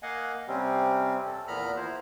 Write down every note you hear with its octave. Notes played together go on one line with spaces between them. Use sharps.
A#3 D#5 F5 F#5 G#5
C3 G3 C4 C#4
A4
E2 A#2 B3 A#5 B5 F6
E4 C5